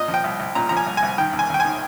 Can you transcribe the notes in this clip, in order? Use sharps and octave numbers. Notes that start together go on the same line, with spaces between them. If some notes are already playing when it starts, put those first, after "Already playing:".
Already playing: A#2 D#5
F3
G5
C2
C2
A#2 A#5
F3 A#5
G#5
C2
G#5
C2
D#3 G5
D#2
G#5
D#2 G5
G#5
D#3